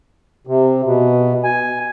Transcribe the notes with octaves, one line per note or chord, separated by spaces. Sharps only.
C3
B2
G#5